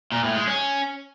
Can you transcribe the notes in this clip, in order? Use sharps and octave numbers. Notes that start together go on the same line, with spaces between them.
A#2
A2
G#3
C#4